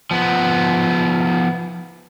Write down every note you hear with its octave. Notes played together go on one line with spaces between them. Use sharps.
F3 B3